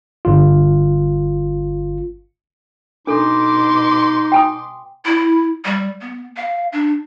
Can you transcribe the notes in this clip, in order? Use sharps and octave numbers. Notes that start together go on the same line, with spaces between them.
G1 F4
B2 D4 D#4 A4 C6 D6
G5 G#5 D#6
E4
G3
B3
F5
D4